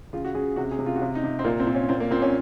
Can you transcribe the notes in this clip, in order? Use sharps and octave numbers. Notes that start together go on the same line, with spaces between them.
C#3 F4
F#4
C#3 G#4
C3 F#4
G#4
C3
F4
F#4
C3 F4
D#4
C3
C4
A#2 A#3
C4
A#2
C#4
A#2 C4
A#3
A#2 C4
C#4